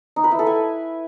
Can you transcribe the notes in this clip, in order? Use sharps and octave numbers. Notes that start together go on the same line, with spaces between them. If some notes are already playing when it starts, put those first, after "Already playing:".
D#4
B4
E4
A4
G#5